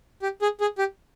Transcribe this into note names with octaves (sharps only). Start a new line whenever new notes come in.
G4
G#4
G#4
G4